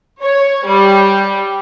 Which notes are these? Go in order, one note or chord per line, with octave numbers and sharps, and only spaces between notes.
C#5
G3